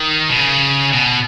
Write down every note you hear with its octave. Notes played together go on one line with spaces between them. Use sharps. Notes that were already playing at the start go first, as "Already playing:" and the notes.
Already playing: D#3
B2
C#3
B2